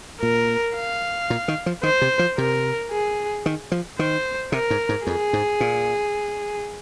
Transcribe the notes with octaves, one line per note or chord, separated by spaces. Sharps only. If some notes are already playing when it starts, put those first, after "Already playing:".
A#2 A#4
F5
A#2
D#3
F3
D#3 C5
C3
F3
C3 A#4
G#4
D#3
F3
D#3 C5
C3 A#4
G#2
G#2
F2 G#4
G#2
A#2